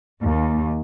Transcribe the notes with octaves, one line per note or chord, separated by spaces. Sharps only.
D#2